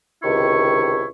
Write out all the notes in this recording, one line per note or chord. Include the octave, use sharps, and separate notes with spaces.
C#2 C3 D#3 E4 C#6